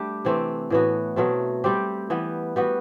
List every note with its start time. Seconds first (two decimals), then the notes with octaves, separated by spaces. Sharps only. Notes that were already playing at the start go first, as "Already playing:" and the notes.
Already playing: G3 A3 D4 G4
0.25 C3 E3 A3 C4
0.70 A2 E3 B3 F#4
1.16 B2 F#3 A3 C4
1.64 G3 C4 G4
2.10 E3 G3 B3
2.56 G3 B3 F#4